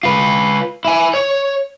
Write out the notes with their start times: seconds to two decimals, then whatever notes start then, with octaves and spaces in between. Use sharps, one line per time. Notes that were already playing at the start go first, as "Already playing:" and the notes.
0.03 F4 B4
0.85 E4 G#5
1.14 C#5